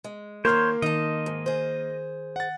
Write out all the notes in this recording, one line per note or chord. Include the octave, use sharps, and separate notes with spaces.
G#3
D#3 A#3 F4 A#4 C5 C#5 C6 F6
D#3 D#4 D#5 A5
G#2
G#4 C5
F#5 A6